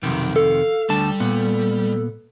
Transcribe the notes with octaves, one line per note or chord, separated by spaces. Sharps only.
B1 F2 C3 D#3
A4 F5
D2 G3 D4 A5
A#2 B3